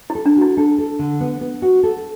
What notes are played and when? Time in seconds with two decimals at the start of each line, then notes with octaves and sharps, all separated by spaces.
0.10 E4
0.15 A4
0.26 D4
0.37 E4 F#4
0.57 D4 A4
0.78 A4
0.99 D3
1.20 B3
1.41 B3
1.62 F#4
1.83 A4